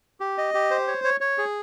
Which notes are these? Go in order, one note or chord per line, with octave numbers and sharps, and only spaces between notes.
G4
D#5
G4
C5
C#5
C#5
C#5
G#4